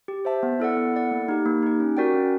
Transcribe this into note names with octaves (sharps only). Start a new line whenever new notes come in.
G4
C5 E5 A5
B3
E4 A4 D5 F#5
B3
E4 A4 D5 F#5
A#3
D#4 G4
A#3
D#4 G4
C#4
F#4 A#4 D5 G5
C#4